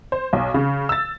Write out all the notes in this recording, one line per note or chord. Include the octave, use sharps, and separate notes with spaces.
C5
B1
C#3
E6 A6